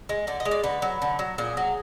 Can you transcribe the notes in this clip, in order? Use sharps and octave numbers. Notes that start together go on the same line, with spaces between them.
G#3
D3 D5
D#5
G#3
D5
D3 B4
F#3
D3
F#3
A#2 G#4
F#3